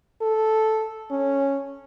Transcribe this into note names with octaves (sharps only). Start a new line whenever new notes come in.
A4
C#4